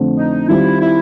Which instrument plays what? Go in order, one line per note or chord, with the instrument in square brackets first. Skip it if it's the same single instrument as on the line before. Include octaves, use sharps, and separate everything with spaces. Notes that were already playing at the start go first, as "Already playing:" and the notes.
Already playing: [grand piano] F2 D3 F3 A3 C4
[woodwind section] D#4
[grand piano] D#3 G3 C4 F4 [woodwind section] E4
[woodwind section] E4